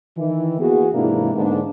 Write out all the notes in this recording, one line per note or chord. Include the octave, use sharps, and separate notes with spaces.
D#3 E3
A#3 B3 E4 F#4 G#4
G#2 C3 E3 A#3 D4 E4
G#2 D3 A#3 B3 D4